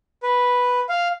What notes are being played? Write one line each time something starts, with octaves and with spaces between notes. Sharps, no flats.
B4
F5